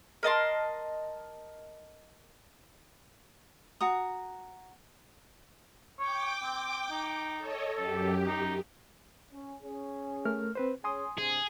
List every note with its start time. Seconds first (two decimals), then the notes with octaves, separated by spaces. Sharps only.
0.23 A#4 D#5 A5 C6
3.80 F#4 A#5 D#6
5.99 C#5 G5 D6
6.43 C4
6.90 D#4
7.38 A4 C#5 D#5
7.77 F#2 G4 A4
8.26 D#4
9.32 C#4
9.62 C#4 G#4
10.25 A3 A#4 F6
10.55 C4 B4 C5
10.84 C#4 G#4 G#5 C6 D#6
11.18 G2 C3 G#4